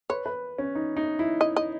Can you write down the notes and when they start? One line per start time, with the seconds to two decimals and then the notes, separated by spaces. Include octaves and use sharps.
0.10 B4 C#5
0.26 B4
0.58 C#4
0.75 D#4
0.97 D#4
1.19 E4
1.41 D#5
1.56 D#5